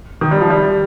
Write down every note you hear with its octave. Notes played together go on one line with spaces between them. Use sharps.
D#3
G3
F3
G3